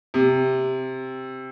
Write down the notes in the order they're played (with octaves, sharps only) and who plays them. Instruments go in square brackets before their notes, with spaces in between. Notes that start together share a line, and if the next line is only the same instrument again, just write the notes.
[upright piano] C3